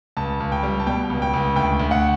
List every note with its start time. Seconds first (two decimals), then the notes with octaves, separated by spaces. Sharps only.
0.17 C#2 A5
0.40 C#2
0.52 G5
0.63 G3
0.79 A5
0.87 B2 G5
1.10 C#2
1.22 G5
1.33 C#2
1.56 D2 G5
1.80 D2
1.91 F#5